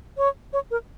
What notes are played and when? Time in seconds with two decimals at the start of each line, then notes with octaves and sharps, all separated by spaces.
0.17 C#5
0.53 C#5
0.71 A#4